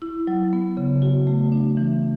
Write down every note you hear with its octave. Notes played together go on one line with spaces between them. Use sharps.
E4
F#3
B3
C#3
F#4
A3
D4
E3